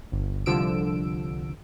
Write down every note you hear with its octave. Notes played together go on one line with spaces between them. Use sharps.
G1
C2 D3 F3 E6 D7